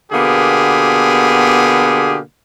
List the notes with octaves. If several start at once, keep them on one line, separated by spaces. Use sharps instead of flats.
B2 D3 A#3 B3 G4 G#4